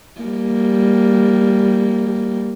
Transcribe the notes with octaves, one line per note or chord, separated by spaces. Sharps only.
G3 A#3